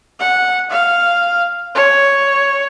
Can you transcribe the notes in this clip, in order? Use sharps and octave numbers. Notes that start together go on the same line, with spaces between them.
F#5
F5
C#5